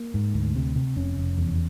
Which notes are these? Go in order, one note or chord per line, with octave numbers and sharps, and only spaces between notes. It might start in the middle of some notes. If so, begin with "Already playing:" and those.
Already playing: A#3
G#2
D2
C3
C3
F1 C#4
F1
E2